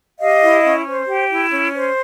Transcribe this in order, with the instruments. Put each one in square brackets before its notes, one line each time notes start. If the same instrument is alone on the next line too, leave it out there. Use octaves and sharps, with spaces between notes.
[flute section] G4 D#5 F5
E4
C#4
C5
G4
E4
C#4
C5